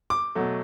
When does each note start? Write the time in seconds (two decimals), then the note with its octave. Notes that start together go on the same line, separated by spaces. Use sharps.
0.10 D6
0.35 B2 F#3 A3